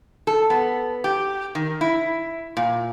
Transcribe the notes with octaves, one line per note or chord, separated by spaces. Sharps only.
A4
B3
G4
D#3
E4
A#2